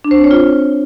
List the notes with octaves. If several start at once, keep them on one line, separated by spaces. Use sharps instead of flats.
D4
C5
C4
C#5
F4